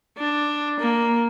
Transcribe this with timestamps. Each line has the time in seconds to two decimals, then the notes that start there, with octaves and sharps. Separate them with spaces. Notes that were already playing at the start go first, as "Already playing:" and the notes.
0.18 D4
0.80 A#3